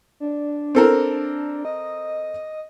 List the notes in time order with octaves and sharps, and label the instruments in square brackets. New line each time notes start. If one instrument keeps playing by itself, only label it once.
[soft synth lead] D4
[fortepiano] C4 A4 A#4
[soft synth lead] D#5